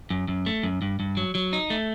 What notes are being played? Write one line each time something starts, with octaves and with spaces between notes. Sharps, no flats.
F#2
F#2
A3
F#2
G2
G2
F#3
F#3
D#4
A3